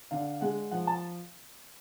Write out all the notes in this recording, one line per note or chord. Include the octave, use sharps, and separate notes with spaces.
D3 F5
G#3 F#5
F3 F#5
A5